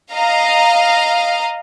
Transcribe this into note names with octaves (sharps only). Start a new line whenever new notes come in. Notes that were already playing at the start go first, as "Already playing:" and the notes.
D#5 F5 A#5